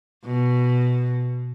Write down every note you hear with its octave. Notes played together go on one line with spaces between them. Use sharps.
B2